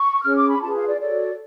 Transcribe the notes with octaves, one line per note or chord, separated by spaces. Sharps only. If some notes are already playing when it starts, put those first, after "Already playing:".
Already playing: C#6
C#4 G#4 C#5 F6
D6
B5
F4 G#4 B4 A5
F5
D5
F#4 A4 C#5 D5